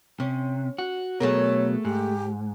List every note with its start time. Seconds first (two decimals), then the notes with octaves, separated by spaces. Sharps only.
0.20 C3 C#4
0.78 F#4
1.20 B2 F#3 A3 G#4 A#4 C#5
1.85 G#2 G4